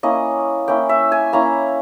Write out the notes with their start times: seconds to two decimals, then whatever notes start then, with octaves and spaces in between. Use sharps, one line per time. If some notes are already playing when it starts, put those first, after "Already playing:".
0.03 A#3 C#4 E4 D#5
0.68 A#3 C#4 E4 G5
0.89 E5
1.12 G#5
1.33 A#3 C#4 E4 A#5